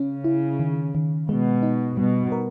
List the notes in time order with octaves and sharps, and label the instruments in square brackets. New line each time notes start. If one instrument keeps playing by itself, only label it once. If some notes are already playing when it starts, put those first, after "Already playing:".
Already playing: [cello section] C#3 [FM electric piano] C#4
[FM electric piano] E4
D#3
D#3
[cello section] B2 [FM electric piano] G#3
[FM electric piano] D#4
[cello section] B2 [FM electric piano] G3
[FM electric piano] A#4